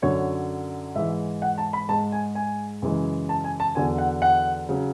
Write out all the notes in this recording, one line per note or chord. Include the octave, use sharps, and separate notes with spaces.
F#2 D3 F#3 C#5
G#2 E3 G#3 E5
F#5
A5
B5
G#2 G#3 A5
G#5
G#5
F#2 C#3 E3 G#3
A5
G#5
A5
E2 D3 F#3 G#5
F#5
F#5
C#3 F#3